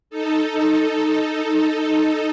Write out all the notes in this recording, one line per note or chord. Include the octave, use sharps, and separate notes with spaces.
D#4 A4